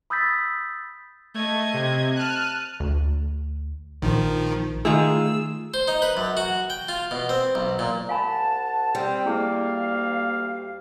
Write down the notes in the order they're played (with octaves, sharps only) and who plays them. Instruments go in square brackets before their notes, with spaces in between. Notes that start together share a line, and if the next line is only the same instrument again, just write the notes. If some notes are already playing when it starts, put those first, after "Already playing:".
[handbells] B5 D#6 E6 G6 A6 B6
[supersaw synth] A3 [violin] D#5 G#6
[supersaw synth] C3
[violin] A5 D#7 [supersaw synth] F6 F#6
[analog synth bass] D2
[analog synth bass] A#1 [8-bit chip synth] D#3 F3
[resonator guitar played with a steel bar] D#3 F4 G#4 [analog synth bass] A3 [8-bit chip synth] E6
[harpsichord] C5
D#4
B4
F#2
F#4
G5
F4
B2
C4
B1
A#2
[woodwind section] C2 F#5 A5 [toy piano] F5 G#5 B5
[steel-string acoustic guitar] G3 [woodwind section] C4
[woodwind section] D2 F5 [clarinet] A#3 [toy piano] E4 G#4 D5